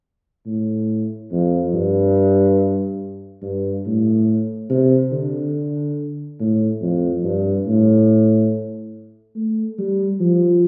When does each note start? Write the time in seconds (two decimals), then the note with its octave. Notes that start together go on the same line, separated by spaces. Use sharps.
0.46 A2
1.31 F2
1.74 G2
3.42 G2
3.85 A2
4.69 C3
5.12 D3
6.40 A2
6.81 F2
7.24 G2
7.67 A2
9.35 A3
9.78 G3
10.20 F3